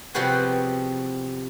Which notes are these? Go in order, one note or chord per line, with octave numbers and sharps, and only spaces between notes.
C3 F3 G3 B3 F#4 G#4